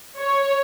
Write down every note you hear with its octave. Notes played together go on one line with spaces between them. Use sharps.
C#5